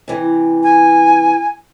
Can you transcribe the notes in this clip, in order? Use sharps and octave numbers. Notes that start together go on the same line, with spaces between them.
C3 E3
G#5